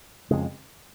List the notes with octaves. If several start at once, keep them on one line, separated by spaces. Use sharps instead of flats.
F2 C#3 G#3